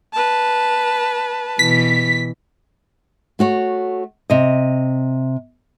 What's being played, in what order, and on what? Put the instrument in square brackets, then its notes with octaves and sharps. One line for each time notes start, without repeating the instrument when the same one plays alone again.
[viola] B4 A5
[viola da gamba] B2 E3 [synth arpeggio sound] B6
[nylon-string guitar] A3 F#4 C#5
C3 D#5